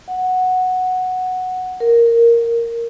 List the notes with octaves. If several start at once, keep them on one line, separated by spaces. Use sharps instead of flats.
F#5
A#4